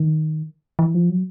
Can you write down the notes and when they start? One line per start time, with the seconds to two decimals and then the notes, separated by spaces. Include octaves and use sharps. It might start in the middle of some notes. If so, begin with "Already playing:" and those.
Already playing: D#3
0.79 E3
0.95 F3
1.10 F#3